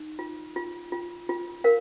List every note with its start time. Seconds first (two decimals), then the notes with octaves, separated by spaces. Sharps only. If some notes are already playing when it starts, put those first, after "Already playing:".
Already playing: D#4
0.19 F4
0.56 F4
0.92 F4
1.29 F4
1.64 A#4 F5